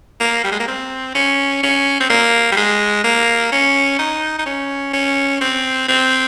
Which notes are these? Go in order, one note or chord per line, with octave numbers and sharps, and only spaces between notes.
A#3
G3
G#3
A#3
C4
C#4
C#4
C4
A#3
G3
G#3
A#3
C#4
D#4
D#4
C#4
C#4
C4
C4